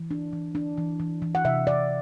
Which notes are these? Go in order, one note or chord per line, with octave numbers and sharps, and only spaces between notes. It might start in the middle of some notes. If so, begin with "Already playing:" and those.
Already playing: E3
D4
E3
D4
E3
E3
E3
F#5
C3 E5
C3 D5